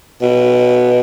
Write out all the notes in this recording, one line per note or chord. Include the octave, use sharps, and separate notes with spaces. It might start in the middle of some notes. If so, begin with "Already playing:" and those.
B2